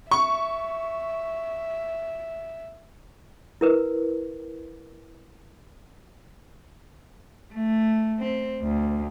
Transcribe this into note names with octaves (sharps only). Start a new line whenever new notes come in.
E5 C#6
E4 A#4 B4
A3
C4
D2